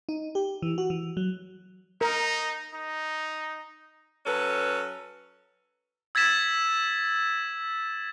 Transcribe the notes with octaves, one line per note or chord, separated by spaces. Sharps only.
D#4
G4
E3
F#4
E3
F#3
D#4 A#4
D#4
F#3 C#4 A4 B4
E6 G#6 A6 B6 E7